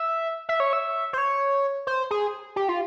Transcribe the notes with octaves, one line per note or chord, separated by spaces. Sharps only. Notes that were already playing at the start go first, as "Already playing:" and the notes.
Already playing: E5
E5
C#5
E5
C5
C#5
C5
G#4
G4
F4